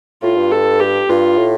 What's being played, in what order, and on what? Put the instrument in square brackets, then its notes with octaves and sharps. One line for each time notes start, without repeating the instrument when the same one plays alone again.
[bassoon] A2 [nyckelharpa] F4
[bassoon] G2
[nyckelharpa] A4
G4
[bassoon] G2 [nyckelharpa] F4
[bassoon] A2